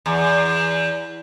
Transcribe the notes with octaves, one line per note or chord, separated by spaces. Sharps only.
E2